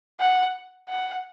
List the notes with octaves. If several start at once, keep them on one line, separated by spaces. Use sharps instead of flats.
F#5
F#5